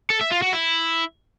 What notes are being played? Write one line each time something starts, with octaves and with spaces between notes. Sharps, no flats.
A4
E5
F4
F#4
E4